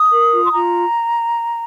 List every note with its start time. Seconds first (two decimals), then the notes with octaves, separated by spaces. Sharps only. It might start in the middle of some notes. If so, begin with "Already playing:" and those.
Already playing: D#6
0.11 A#4
0.33 F4
0.45 C6
0.52 F4 A#5